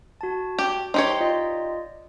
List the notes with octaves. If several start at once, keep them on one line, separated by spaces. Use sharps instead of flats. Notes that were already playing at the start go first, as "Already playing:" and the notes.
F#4 A5
G4
D#4 G4 C5 C#5 G5 C6
F4 D5 D#5